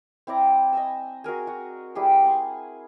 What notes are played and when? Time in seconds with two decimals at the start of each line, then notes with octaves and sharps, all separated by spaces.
0.27 C4 E4 D5 A#5
0.73 D#5 G#5 E6
1.24 F#4 G#4 A#4 G#5
1.47 F#4
1.95 G3 E4 G4 G#4
2.23 F#5 G#5 C6